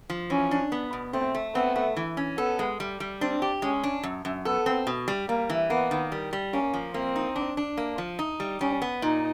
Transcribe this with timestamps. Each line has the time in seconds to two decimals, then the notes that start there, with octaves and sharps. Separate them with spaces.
0.10 F3
0.30 E3 C#4
0.51 D4
0.72 B3
0.93 B2
1.13 A3 C4
1.35 A3
1.55 B3 C4
1.76 A3
1.97 E3
2.17 C#4
2.37 B3 A4
2.59 G#3
2.80 G3
3.00 G3
3.21 C4 D4
3.42 G4
3.62 G#3 C#4
3.84 D4
4.03 F#2
4.25 F#2
4.45 B3 A4
4.66 C4
4.87 B2
5.08 G3
5.29 G3 A#3
5.50 E3
5.70 A#3 B3
5.91 D#3
6.12 G3
6.33 G3
6.53 A#3 C#4
6.74 F3
6.94 A#3 C4
7.16 D#4
7.36 D4
7.57 D4
7.77 A#3
7.98 F3
8.19 D#4
8.40 G3
8.61 G3 C#4
8.82 B3
9.02 A#2 D#4